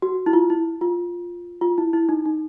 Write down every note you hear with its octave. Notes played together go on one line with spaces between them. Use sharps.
F#4
E4
F4
E4
F4
F4
E4
E4
D#4
D#4